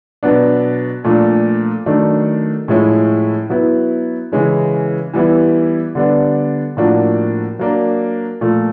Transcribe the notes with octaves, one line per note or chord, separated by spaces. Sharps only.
B2 F#3 B3 D4
A#2 F3 A3 D4
D#3 F#3 A3 D4
A2 F3 G#3 C#4 E4
F#3 B3 E4
C#3 E3 G#3 C#4 E4
E3 G3 B3 E4
D3 G3 B3 D4
A2 F3 A#3 D4 F#4
F#3 A#3 D4
A#2 F3 A3